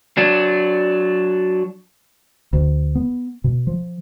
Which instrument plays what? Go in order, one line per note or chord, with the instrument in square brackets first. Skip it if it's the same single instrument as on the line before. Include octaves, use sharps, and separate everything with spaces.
[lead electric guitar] F#3 D4
[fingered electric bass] D2
B3
B2
F3